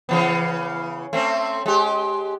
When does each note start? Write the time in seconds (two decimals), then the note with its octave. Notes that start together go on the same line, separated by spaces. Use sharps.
0.09 C#3 E3 B3
1.13 A3 C4 C#4
1.66 G#3 G4